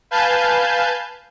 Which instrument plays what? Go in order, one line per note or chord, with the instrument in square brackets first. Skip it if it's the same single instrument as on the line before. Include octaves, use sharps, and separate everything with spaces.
[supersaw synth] B4 F5 G#5 A5 G6